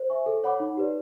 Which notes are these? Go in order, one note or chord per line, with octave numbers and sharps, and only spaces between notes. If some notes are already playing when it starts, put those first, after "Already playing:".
Already playing: C5
E5 G#5 C#6
A4
C#5 F#5 B5 D6
D#4
G4 B4 D5